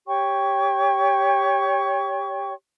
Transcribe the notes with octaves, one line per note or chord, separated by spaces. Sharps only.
G4 C#5 G5 C#6